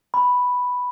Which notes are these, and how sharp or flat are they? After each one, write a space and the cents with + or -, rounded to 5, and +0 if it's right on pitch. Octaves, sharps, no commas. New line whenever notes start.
B5 +0